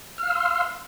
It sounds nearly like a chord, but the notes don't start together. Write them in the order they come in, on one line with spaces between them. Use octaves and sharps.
F6 F5 E6 C6